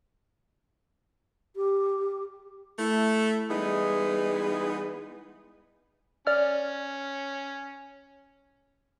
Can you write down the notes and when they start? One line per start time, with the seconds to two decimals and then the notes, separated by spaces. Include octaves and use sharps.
1.56 G4
2.79 A3 E4
3.49 E3 G3 G#3 B3 D#4 G#4
6.27 C#4 D5 F6